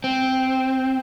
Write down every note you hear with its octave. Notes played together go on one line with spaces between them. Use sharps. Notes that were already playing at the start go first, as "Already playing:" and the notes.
C4